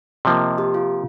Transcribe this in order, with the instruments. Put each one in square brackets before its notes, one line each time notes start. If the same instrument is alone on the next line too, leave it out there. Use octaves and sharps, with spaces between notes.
[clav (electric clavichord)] C3 F3 A#3 [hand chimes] D#5
[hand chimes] G4
F4